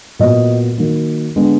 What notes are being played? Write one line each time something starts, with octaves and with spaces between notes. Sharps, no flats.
A#2 F#3 B3 D#5
D#3 F#3 A#3
D3 G#3 B3